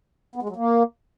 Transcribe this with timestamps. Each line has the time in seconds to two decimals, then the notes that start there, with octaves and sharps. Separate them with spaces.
0.36 B3
0.42 G#3
0.49 F#3
0.56 A#3